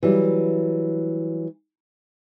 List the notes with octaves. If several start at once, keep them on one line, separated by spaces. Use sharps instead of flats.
E3 F#3 G3